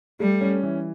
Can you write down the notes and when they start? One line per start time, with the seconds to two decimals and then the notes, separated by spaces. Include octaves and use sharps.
0.20 G3 A3
0.41 C#4
0.63 E3